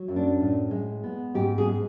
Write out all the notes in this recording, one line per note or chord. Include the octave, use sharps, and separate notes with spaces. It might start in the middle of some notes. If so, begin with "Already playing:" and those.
Already playing: F#3
F#2
D4
A2
G#3
B3
G#2 G4
G#4
G#3